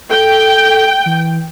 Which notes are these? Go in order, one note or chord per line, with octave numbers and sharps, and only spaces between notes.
A4 G5
E3